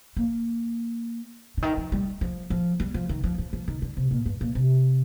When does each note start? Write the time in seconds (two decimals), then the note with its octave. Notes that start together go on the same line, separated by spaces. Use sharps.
0.17 A#3
1.57 D3
1.62 D#3
1.77 F3
1.92 G3
2.21 F3
2.50 F3
2.80 G3
2.94 F3
3.09 D#3
3.24 F3
3.38 F3
3.53 F3
3.68 D#3
3.82 D3
3.97 C3
4.11 A#2
4.26 G2
4.41 A#2
4.55 C3